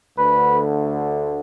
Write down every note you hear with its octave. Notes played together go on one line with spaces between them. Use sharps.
D2 D3 A3 B4